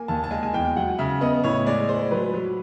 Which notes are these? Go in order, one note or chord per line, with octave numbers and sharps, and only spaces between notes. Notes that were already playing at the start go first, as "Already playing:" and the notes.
Already playing: A#3 G#5
D#2 A5
A5
G#3 G#5
G#5
E2 G5
G5
F#3 F#5
C#3 E5
B3 D#5
A2 C#5
G#3 D5
G#3 C5
F#3 B4
F#3